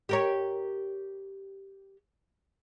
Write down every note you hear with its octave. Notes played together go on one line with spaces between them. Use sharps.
G4 A#4 C#5